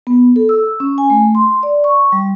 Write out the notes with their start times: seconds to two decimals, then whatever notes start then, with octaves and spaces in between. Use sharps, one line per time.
0.07 B3
0.36 A4
0.49 E6
0.80 C#4
0.98 G#5
1.10 A3
1.35 C6
1.63 D5
1.84 C#6
2.12 G3